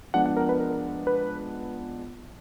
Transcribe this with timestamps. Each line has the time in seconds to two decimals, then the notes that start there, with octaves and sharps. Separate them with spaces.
0.14 F3 G#3 B3 D4 F#5
0.26 F#5
0.37 A#4
0.49 B4
0.60 A#4
1.07 B4